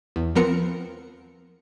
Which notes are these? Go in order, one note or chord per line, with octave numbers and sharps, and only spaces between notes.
E2
F3 B3 C4 A#4 C#7